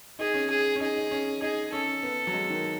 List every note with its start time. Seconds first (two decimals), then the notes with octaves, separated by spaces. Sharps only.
0.19 D#4 G#4
0.34 C#4
0.50 G#4
0.76 C#4
0.81 D#4 G#4
0.96 D#4
1.11 C#4
1.42 D#4 G#4
1.73 C#4 A4
2.03 B3
2.27 F#3
2.33 G#3
2.50 D#3